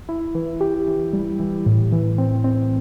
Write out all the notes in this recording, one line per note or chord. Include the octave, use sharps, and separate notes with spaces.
E4
E3
G4
E3
G3
E3
A2
E3
C4
C4